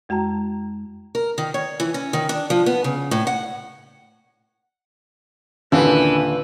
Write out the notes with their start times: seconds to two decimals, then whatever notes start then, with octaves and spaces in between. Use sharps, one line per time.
0.09 F2 G#3 F#4 A5 A#5
1.15 A#4
1.38 D#3
1.54 C#5
1.80 E3
1.94 C#4
2.13 D#3
2.29 D4
2.50 F3
2.66 B3
2.84 C#3
3.11 A2
3.27 F#5
5.72 D#2 A#2 D3 E3 C#4 D4 B4